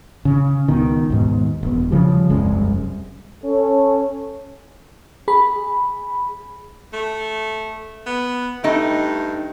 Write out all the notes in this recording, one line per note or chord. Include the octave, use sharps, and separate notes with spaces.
C#3
C#2 B2 D#3
D#2 G#2 B2
E1 B2
C#3 F3 G3
E1 C2 F#2 G#3
C#4 A4
G#4 B5
A3
B3
G2 A3 D#4